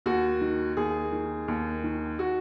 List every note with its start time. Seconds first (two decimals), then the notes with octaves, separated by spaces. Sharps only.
0.06 D#2 F#4
0.41 D#3
0.77 D#2 G#4
1.12 D#3
1.48 D#2
1.84 D#3
2.19 F#4